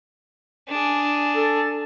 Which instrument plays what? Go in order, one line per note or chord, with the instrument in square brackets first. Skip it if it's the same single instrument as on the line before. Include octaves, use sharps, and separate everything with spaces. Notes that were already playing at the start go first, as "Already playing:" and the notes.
[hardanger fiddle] D4 G#4
[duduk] A4